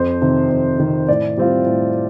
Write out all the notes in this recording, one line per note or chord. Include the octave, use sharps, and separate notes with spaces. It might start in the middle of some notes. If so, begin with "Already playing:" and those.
Already playing: F2 C5
C3 D#3
F2
C3 D#3
A2 D5
G3 C4 F4
A2